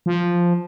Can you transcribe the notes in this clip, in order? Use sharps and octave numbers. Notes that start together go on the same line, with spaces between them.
F3